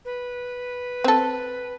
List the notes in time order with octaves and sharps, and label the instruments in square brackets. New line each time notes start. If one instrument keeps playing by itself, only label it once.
[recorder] B4
[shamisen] C4 A4